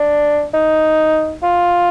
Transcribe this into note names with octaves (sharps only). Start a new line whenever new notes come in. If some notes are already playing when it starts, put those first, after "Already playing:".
Already playing: D4
D#4
F4